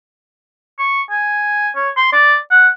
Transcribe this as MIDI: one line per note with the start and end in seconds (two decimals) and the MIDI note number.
0.79 1.02 85
1.10 1.68 80
1.76 1.89 73
1.97 2.11 84
2.13 2.36 74
2.51 2.68 78